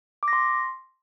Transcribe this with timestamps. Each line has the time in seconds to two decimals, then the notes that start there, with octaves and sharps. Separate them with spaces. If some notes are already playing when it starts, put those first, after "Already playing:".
0.23 D6
0.28 A#6
0.33 C6